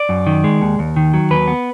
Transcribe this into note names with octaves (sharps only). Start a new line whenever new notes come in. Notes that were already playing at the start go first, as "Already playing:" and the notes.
Already playing: D5
F#2
D#3
G#3
D#2
D#2
D#3
F#3
D#2 B4
B3